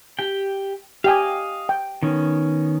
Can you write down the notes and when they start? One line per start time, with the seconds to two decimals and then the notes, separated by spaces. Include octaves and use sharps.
0.19 G4 G5
1.04 G4 D#5 F5 G5 G#5
1.69 G5
2.03 D#3 B3 C#4